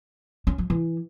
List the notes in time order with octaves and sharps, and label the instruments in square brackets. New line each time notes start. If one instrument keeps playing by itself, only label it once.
[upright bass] C#4
F3
E3